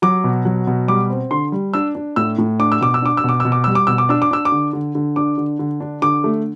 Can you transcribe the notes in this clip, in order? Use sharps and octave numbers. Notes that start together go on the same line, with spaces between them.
F#3 D6
B2
F#3
B2
G3 D6
C4
D3 C6
G3
D4 E6
D4
A2 E6
A2
D4 D6
E6
B2 D6
E6
D4 D6
E6
B2 D6
B2 E6
D6
G3 E6
D6
B2 E6
D6
D4 E6
D6
D4 E6
D6
D3
D3
D3
D4 D6
D3
D3
D4
D3 D6
A3